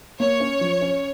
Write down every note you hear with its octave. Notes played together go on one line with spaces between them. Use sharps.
A#3 C#5
C#4
F3
C#4